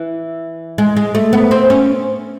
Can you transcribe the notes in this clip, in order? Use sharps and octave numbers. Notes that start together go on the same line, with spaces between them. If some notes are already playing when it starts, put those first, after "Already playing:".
Already playing: E3
G#3
G#3
A3
B3
C4
C#4